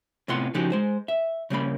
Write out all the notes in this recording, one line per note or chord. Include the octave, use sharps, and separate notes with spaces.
A2 C3 B3 F4 F#5 C6
C#3 F3 D#4 F#4 G4
G#3 C5
E5
C#3 G3 A#3 B5